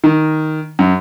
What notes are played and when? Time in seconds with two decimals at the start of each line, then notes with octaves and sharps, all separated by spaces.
0.04 D#3
0.79 F#2